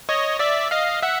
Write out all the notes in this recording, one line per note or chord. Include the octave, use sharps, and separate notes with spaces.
C#5 D#5
D5 E5
D#5 F5
E5 F#5